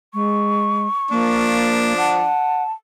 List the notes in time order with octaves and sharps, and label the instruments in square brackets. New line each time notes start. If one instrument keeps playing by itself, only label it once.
[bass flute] G#3 [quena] C#6
[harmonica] F3 D4 [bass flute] A#3
[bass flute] F#5 [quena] A5